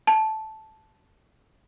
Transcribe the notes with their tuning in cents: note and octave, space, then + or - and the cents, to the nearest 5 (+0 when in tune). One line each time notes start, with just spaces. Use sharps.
A5 -10